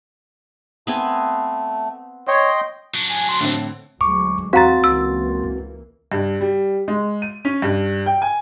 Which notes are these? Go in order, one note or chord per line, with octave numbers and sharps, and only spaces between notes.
A3 B3 C4 G#5
C#5 D#5 G5 C6
F#3 D4
G#5
C6
A2 D3 C4
D2 F#3 G#3 C#6 D6
E2 C4 F#4 F5 A#5 C6 A6
C#2 E3 A#3 E6
G2
G3
G#3
D#7
C#4
G2
G5
G#5